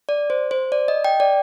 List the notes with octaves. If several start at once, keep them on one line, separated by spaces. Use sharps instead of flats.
D5
C5
C5
D5
D#5
G5
D5